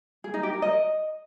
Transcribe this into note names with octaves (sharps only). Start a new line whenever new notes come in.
G#4
D#4
G4
A#4
D#5